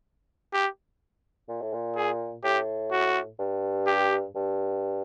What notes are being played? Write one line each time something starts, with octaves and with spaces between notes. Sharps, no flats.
G4
A#2
A2
A#2
G#4
A2 G4
F#4
G2
G4
G2